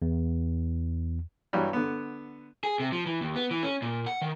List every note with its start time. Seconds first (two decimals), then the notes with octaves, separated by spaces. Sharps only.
0.02 E2
1.53 G2 E3 F#3 G3
1.73 D3 B3
2.63 G#4
2.80 C3
2.92 F3
3.06 E3
3.21 D#2
3.36 B3
3.51 E3
3.63 C#4
3.82 A#2
4.06 F#5
4.22 D#3